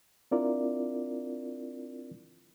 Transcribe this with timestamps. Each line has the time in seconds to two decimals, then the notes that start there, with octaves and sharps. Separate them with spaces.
0.31 C4 D4 E4 F4 A#4 D5